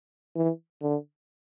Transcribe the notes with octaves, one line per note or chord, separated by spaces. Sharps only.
E3
D3